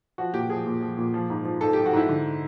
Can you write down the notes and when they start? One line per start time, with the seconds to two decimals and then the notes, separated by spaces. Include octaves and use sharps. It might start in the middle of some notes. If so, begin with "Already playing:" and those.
0.18 F3 F#4
0.34 A#2 G4
0.50 F3 G#4
0.66 A#2
0.81 F3
0.98 A#2
1.14 F3
1.30 G#2
1.45 F3
1.61 G#2 A4
1.73 F3 G4
1.86 F#4
1.93 G#2 E4
2.09 D3